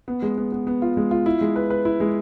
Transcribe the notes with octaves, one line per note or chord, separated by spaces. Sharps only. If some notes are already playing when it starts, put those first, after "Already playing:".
B3
G#3
B3
B3
B3
F4
G#3
F4
E4
G#3
B4
B4
E4
G#3